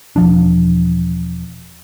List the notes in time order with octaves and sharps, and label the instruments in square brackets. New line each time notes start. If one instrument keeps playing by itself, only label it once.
[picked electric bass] E1 F3 D4